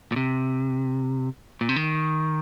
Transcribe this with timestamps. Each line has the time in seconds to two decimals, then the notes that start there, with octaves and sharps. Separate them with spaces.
0.12 A#2
0.16 C3
1.61 A#2
1.69 C3
1.76 D#3